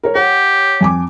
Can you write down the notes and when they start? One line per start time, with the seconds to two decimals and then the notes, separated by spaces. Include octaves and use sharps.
0.03 A#4 C#5
0.15 G4 C#5 F#5
0.81 F2 G#5 D6